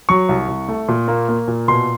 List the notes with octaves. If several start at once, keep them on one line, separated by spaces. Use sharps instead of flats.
F#3 C#6
C2
C2
A3
A#2
A#3
A#3
A#2
B2 C6